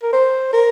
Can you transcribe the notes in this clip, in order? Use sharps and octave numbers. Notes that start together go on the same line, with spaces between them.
A#4
C5
A#4